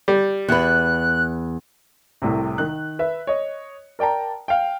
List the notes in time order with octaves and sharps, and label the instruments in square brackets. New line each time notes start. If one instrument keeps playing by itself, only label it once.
[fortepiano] G3
[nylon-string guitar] E2 B4 [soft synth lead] F#6
[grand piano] C2 A2 C3
D#3 F#6
B4 E5
C#5 D#5
A#4 D5 G5 A5 A#5
F5 G5